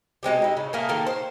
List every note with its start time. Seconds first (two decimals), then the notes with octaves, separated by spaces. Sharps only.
0.23 B2 G#3 C4 G4
0.42 D#4 E4
0.57 C#3
0.73 A3 A#3 G#4 A#4
0.89 D#3 A#3 A4 A#4
1.07 C5